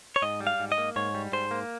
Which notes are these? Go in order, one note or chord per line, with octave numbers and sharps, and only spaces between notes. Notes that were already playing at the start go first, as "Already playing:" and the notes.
C#5
G#2 D#5
G3
F5
G#2
D#5
A#3
G#2 C#5
G3
G#2 C5
A#3